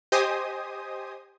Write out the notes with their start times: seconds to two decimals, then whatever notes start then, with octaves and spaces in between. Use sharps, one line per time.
0.12 G4 C5 D#5 G#5 D#6